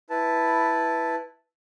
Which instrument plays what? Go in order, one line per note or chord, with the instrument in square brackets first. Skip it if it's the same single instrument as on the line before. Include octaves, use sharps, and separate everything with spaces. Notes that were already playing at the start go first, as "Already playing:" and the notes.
[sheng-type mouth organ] E4 B4 A5